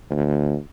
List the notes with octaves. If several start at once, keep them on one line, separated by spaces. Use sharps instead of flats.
D2